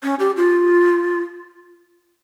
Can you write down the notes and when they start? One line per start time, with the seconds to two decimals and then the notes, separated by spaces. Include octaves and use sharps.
0.03 C#4
0.19 G4
0.37 F4